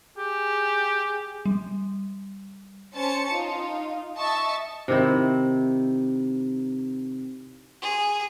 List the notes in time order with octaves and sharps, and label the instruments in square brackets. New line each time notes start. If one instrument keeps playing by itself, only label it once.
[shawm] G4 [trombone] G#4
[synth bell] G3
[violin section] C#4 C5 A5 C#7
D#4 F4
D#5 E5 A5 C#6
[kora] C3 D#3 E4
[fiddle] G#4